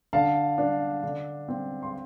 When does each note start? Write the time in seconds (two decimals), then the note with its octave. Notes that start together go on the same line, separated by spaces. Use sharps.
0.13 D3 F5 A5
0.58 D4
1.03 D3
1.48 C4
1.83 C6